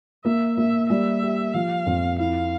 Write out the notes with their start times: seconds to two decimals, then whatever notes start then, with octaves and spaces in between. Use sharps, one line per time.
0.25 A#3 E5
0.57 A#3 E5
0.90 G3 E5
1.22 G4
1.54 F3 F5
1.86 F2
2.19 E4 F5